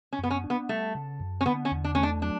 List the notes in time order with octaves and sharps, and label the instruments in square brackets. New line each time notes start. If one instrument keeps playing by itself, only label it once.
[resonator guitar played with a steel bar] C#4
[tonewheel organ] F#2 [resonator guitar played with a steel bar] B3
[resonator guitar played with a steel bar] C#4
[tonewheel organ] D4
[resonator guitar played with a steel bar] B3
[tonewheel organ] G3 [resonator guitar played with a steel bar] A3
[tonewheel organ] C#3
F#2
[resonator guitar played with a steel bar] C#4
[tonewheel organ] D3 [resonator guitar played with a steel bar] B3
[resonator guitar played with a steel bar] C#4
[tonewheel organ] E2
[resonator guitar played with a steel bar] D4
[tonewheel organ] A3 [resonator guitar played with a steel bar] C#4
[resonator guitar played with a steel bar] D4
[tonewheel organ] F#3 [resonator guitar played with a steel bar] D4